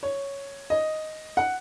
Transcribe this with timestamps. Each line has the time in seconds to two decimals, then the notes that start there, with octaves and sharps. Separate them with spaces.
0.03 C#5
0.70 D#5
1.37 F#5